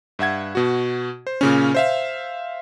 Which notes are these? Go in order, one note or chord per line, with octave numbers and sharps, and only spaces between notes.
G2 E5 F#5 G#6
B2 F#4
C5
A#2 C#3 C#4
C5 E5 F5